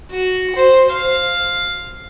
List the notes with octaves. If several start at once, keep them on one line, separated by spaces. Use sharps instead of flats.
F#4
C5
F5